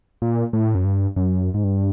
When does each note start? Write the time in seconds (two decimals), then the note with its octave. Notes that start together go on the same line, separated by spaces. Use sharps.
0.22 A#2
0.53 A2
0.75 F#2
0.85 G2
1.16 F#2
1.54 G#2
1.64 G2